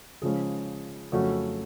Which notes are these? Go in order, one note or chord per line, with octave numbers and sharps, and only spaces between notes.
C#3 F3 G#3 C#4 G#4
F2 C#3 F#3 A3 C#4 F#4 A4